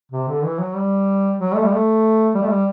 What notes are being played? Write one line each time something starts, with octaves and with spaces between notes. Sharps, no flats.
C3
D3
E3
F#3
G3
F#3
A3
G3
A3
G3
A3
G3